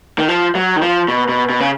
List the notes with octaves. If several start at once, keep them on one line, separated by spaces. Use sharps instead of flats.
D#3
F3
F#3
D#3
F3
B2
B2
B2
C#3